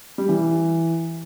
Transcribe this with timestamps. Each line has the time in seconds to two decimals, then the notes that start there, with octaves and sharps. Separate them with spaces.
0.18 G3
0.29 E3